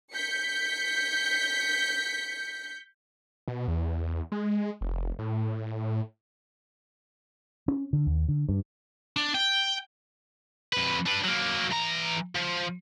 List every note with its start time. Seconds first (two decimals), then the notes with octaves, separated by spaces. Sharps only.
0.14 G6 B6 C#7
3.48 B2
3.68 E2
4.32 G#3
4.81 F1
5.19 A2
7.68 C#4
7.93 D3
8.06 D#2
8.29 D3
8.49 G2
9.17 D4
9.35 G5
10.73 F2 B4
11.06 D4 B4
11.24 F#3 A#3
11.71 E3 A#5
12.35 F3